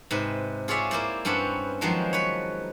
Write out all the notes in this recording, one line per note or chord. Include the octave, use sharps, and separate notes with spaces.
G#2 C3 B4
F4 G#4 C#5 D5 E5
A#3 E4 C5 D5
G2 C4 C#4 B4 F#5 A5
D#3 F3 F#3 G#3 B3 C5
B4 C#5